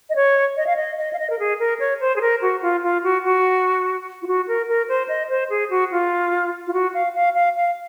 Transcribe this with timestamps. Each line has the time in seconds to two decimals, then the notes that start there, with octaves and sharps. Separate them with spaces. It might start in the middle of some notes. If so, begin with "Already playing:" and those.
0.10 D#5
0.16 C#5
0.57 D#5
0.67 F5
0.76 D#5
0.97 D#5
1.13 F5
1.19 D#5
1.30 A#4
1.39 G#4
1.60 A#4
1.80 C#5
2.00 C5
2.16 G#4
2.21 A#4
2.42 F#4
2.62 F4
2.83 F4
3.04 F#4
3.25 F#4
4.22 F4
4.27 F#4
4.48 A#4
4.68 A#4
4.89 C5
5.08 D#5
5.30 C5
5.50 G#4
5.70 F#4
5.92 F4
6.67 F4
6.73 F#4
6.94 F5
7.15 F5
7.35 F5
7.56 F5